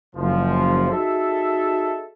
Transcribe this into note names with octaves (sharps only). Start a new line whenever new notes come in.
F#1 F3
D#4 F#4 G#4 A4 D#5 E5